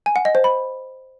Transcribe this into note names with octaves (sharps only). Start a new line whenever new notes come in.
G#5
F#5
D#5
C5
B5